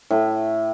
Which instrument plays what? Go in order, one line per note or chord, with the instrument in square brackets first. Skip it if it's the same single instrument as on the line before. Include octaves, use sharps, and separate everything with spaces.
[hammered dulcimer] A2